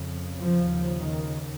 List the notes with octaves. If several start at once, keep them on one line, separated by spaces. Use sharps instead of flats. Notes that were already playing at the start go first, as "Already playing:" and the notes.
Already playing: F2 C#3
F3
D#2 C#3
D#3